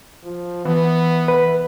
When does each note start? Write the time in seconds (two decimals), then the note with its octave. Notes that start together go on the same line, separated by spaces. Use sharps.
0.24 F3
0.65 E3 B3
1.28 B4